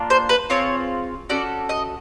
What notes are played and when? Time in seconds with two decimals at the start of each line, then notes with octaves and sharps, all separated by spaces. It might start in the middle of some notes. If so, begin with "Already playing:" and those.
Already playing: A#3 D4 F4
0.10 C5
0.29 B4
0.50 C4 F4 G#4 C#5
1.29 C#4 F#4 A4 D5
1.69 D#5